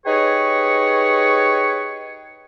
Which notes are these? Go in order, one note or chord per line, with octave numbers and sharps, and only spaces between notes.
D#4 G4 G#4 B4 C#5